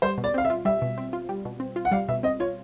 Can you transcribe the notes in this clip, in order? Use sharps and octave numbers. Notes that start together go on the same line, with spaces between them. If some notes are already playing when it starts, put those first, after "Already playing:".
G3 C5
B2
D5
C4 F5
E5
F4
G3 E5
B2
C4
F4
G3
B2
C4
F4
F#5
G3 F5
B2 E5
C4 D#5
F4 C#5